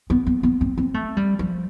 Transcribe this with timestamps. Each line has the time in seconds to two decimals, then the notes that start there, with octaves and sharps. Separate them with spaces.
0.10 B3
0.27 B3
0.43 B3
0.61 C4
0.78 C4
0.94 A3
1.17 G3
1.39 F3